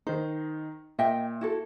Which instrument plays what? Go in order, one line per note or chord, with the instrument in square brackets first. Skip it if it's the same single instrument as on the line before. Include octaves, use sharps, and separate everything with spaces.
[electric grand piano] D#3 D#4 [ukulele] C5
[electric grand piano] A#2 [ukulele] D#5 E5 G5
[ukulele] E4 F#4 A4